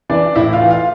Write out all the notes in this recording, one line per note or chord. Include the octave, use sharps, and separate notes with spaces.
E3 D4 D5
A2 E4 E5
F4 F5
E3
F4 F5